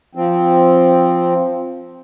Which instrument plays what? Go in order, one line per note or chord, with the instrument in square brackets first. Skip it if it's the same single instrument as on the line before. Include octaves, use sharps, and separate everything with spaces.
[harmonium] F3 C4